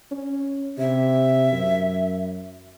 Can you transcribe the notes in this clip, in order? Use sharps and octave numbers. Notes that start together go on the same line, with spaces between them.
C#4
C3 E5
F#2